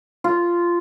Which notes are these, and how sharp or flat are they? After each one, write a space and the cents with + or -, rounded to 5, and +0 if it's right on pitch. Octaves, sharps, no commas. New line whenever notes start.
F4 -10